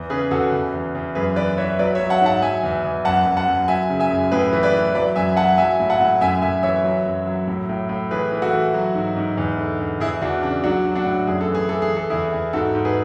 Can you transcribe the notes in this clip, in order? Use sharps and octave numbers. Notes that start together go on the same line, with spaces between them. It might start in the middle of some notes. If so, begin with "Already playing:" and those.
Already playing: E2
C#3 G#4 B4
E2 F#4 A4
E2
E2
E2
F#2 G#4 B4
E3 B4 D5
E3 C#5 E5
F#3 B4 D5
C#5 E5
F#3
F#5 A5
G#2 F#5 A5
F#3 E5 G#5
E2
E2
F#2 F#5 A5
F#2
F#5 A5
F#2
F#3 E5 G#5
C#3
E5 G#5
F#2
A2 G#4 B4
E3
B4 D5
E3
F#3 B4 D5
F#2 E5 G#5
F#3 F#5 A5
F#3 E5 G#5
A2
F#5 A5
A2
F#2 E5 G#5
F#2 E5 G#5
E3 C#5 E5
F#3
F#2
F#3
A2
A2
A2
E3 G#4 B4
E3
F#4 A4
E3
F#3
G#2
G#2
E2
D3
E2
E2 E4 G#4
E2 D4 F#4
C#3 D4
F#3 D4 F#4
F#3
D4 F#4
A2
F#2 G#4
A4
E3
G#4
E3 A4
G#4
E3
A4
E2 E4 G#4
E2
G#2 F#4 A4
G#2
G#4 B4